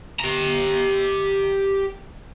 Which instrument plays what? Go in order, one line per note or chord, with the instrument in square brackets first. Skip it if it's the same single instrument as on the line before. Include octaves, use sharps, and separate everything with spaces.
[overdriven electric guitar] G4 A#5